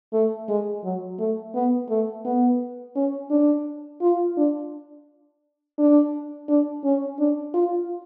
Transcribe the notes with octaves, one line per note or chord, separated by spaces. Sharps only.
A3
G#3
F#3
A3
B3
A3
B3
C#4
D4
F4
D4
D4
D4
C#4
D4
F4